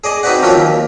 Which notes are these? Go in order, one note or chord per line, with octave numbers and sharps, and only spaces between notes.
G#4 D5 D#5 G#5
C4 D#4 F#4 B4 D5 F#5
F3 F#3 A#3 C4 E4 F4
D#2